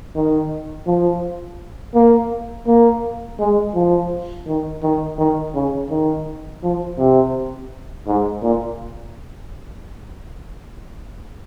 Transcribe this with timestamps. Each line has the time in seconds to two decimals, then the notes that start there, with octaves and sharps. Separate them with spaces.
0.16 D#3
0.87 F3
1.94 A#3
2.67 A#3
3.39 G#3
3.74 F3
4.47 D#3
4.82 D#3
5.18 D#3
5.54 C#3
5.90 D#3
6.63 F3
6.98 C3
8.07 G#2
8.42 A#2